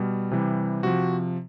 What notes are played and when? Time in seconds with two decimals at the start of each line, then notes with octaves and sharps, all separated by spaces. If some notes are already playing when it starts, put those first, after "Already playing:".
Already playing: B2 G3
0.31 C3 E3 G3
0.83 C3 F3 F#4